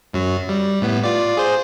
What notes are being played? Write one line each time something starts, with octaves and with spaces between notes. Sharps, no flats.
F#2 F#3
G3
A2 B3
F4 D5
G#4 C5